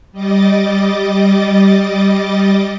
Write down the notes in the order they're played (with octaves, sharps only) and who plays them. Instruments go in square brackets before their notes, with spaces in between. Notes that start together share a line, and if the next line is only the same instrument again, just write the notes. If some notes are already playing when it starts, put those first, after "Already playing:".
[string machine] G3 D#5 D6 A6